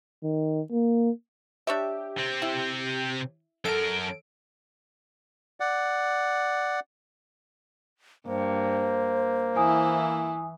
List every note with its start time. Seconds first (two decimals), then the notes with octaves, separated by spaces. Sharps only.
0.23 D#3
0.72 A#3
1.67 D4 G4 C#5 E5
2.18 C3 C4
2.42 E4
3.65 F#2 A4 A#4 D7
5.60 D5 F#5
8.27 G2 A#3 C5
9.56 E3 E4 G#5 D#6